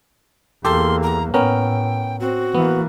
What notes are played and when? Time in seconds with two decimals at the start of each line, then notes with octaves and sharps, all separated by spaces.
0.65 E2 A#3 G4 A4 C6
1.03 A#5
1.34 A2 B3 C#4 A#4 G5
2.20 C4 F#4
2.55 E3 A#3 B3